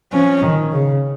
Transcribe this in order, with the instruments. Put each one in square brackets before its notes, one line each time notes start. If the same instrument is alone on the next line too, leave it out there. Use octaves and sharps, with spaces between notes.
[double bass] F3 [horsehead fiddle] C#4
[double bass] D#3
C#3